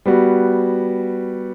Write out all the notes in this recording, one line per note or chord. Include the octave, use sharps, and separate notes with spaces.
G3 B3 F#4